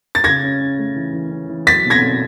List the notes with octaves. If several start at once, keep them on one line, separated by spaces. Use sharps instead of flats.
A6
C#3 G#6 A#6
C#4
C#4
A3
E3
E3
C#4
E3
F#3 A6 B6
B2
G#6 A#6
B2